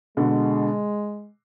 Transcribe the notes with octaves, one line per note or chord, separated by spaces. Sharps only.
B2 D3 G#3